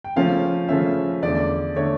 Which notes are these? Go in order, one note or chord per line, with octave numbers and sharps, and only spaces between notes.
G5
C#3 F3 A3 C#4 F5
C#3 F3 A3 C#4 E5
E2 D3 A3 D5
D3 A3 C#5